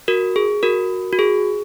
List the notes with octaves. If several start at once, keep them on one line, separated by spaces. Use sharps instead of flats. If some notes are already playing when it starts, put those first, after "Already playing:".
F#4 A#4
G#4
F#4 A#4
F#4
G#4